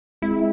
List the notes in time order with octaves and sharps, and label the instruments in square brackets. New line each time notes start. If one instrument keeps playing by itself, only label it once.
[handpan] G#3 C4 [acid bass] E4